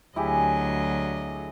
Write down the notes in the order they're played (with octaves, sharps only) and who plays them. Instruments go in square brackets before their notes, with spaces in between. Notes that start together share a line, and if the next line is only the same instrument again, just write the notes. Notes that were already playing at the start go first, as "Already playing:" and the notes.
[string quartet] D2 F#3 D#5 [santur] E4 G4 G#4